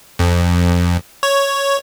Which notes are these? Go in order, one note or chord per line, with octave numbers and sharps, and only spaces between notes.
F2
C#5